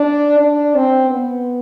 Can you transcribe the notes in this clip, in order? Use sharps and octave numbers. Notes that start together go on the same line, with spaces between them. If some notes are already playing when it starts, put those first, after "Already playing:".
Already playing: D4
D4
C4
B3